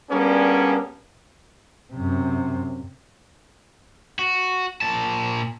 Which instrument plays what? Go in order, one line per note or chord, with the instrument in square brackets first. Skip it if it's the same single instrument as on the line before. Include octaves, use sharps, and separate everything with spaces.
[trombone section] G3 A#3 B3 C#4 D4 G#4
[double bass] F#2 C3
[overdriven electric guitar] F#4
A#2 A5